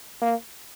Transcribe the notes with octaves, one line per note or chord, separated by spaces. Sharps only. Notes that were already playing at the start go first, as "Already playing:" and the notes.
A#3